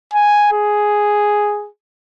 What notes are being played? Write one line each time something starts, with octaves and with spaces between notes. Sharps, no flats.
G#5
G#4